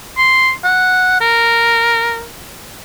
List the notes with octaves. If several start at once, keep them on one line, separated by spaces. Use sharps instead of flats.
C6
F#5
A#4